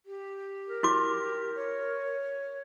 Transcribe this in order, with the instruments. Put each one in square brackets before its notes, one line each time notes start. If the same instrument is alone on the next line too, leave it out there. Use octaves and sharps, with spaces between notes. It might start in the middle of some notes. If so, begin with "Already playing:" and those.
[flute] G4
[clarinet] A#4
[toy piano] E4 F#4 D6
[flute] C#5